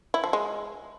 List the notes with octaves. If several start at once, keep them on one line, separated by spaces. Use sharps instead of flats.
E4
F3
G#3